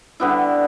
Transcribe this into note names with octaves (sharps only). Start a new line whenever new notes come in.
D3 G3 B3 E4